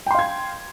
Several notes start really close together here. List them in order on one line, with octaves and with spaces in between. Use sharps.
G5 C6 F5 G#6